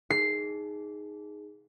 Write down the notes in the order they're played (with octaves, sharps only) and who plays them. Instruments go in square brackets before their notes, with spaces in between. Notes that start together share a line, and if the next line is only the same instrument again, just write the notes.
[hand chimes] D#4 G#4 [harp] C7